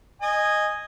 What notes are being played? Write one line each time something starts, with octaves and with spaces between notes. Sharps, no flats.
D#5 G#5